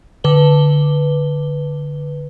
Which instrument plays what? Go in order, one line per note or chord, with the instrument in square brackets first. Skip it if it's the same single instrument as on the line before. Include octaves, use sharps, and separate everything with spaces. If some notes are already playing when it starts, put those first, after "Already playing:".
[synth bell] D3 B4 G7